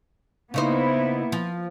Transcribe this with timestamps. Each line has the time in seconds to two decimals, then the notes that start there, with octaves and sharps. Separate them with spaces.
0.54 C#3 A#3 B3 D#4 E4 C5
1.32 F3